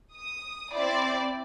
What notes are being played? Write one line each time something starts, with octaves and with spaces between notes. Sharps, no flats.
D#6
C4 E4 C5 D5